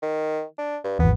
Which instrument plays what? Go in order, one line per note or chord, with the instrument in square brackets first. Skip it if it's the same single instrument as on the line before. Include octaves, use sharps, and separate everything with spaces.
[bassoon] D#3
D4
G2
[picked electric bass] G#1 E2 [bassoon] B3